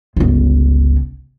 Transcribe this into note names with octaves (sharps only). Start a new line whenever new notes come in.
G1 C#2